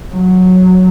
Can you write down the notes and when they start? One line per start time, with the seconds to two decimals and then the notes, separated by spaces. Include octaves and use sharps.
0.14 F#3